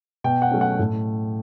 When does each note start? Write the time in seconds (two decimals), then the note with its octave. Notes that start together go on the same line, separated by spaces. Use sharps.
0.24 B2 G5
0.42 F#5
0.51 F#3 A3 C#4
0.61 F#5
0.79 A2